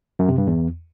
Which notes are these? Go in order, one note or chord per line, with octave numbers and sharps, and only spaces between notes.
F#2
C3
G2
E2